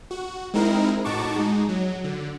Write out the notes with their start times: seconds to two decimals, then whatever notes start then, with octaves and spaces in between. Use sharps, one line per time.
0.11 F#4
0.54 G#3 C4 D#4 E4 A#4
1.05 A2 D#4 F#4 A5 C#6 D6
1.36 G#3 D#4
1.69 F#3
2.04 D3